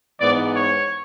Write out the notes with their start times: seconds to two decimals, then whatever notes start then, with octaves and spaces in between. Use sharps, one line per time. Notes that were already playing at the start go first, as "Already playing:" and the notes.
0.20 G#2 E3 B3 D5
0.54 C#5